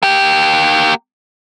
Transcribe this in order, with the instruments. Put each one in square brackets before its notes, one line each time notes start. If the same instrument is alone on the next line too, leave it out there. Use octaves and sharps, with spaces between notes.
[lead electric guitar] A#3 G4